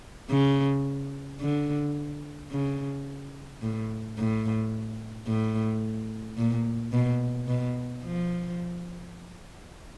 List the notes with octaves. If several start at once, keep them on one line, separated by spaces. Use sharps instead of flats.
C#3
D3
C#3
A2
A2
A2
A#2
B2
B2
F3